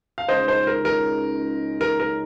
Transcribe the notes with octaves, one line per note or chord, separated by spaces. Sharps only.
F5
C#2 C#3 G#3 D#4 C5 D#5
C5
A#4
A#4
A#4
A#4